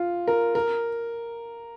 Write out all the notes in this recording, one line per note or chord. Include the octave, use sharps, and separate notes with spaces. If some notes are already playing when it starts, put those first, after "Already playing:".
Already playing: F4
A#4
A#4